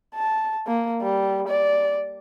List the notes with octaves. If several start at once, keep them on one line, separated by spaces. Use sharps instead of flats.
A5
A#3
G3
D5